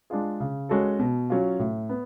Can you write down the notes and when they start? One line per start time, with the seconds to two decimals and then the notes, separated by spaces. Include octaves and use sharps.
0.10 G#3 D4 F4 G#4
0.40 C#3
0.69 G#3 C#4 F#4 A4
0.99 B2
1.30 F#3 C#4 F4
1.59 A2
1.89 B3